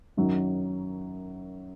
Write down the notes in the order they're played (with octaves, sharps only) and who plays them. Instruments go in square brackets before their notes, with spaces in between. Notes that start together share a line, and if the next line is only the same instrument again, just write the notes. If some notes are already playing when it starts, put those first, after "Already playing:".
[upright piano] F#2 D#3 F#3